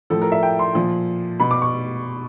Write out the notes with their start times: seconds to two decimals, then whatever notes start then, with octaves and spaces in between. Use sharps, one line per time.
0.10 A2 F3 A4
0.22 A#4
0.32 E5
0.43 G5
0.59 C6
0.75 A#2 F3
1.40 B2 B5
1.51 D6
1.62 C#6